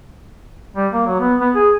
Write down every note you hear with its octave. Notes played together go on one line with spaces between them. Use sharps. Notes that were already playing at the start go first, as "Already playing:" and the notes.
G3
A#3
F#3
B3
B3
G#4